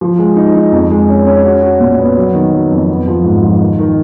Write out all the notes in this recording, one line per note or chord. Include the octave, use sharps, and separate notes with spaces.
F3
G#3
D#4
D#4
F2
G#3
C#4
C#4
F#4
F#4
A#2
B3
F#3
D#3
F#3
F2
B3
F3
G#2
F3
D#3
D#3